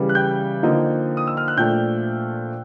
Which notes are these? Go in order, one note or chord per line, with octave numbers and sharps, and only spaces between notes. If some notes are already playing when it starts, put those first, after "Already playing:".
Already playing: C#3 E3 G3
F#6
G5 G6
D3 F3 A#3 D#4
D#6
E6
F6
F#6
A#2 F3 A3 D4 G5 G6